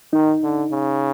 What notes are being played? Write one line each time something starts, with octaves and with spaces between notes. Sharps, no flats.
D#3 D#4
D3
C#3